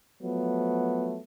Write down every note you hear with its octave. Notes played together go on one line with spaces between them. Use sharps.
F3 F#3 A3 B3